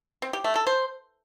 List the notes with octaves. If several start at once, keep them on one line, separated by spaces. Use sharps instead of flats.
C4
G4
A3
A4
C5